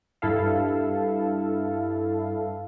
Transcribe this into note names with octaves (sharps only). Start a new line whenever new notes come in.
G2 E4 A4 F5